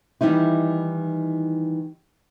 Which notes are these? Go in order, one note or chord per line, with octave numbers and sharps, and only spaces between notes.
D#3 E3 G3 D#4 E4